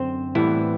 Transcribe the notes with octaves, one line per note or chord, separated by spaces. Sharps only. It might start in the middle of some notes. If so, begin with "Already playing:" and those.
Already playing: F#2 D3 C4 C5
A2 E3 G3 B3 E4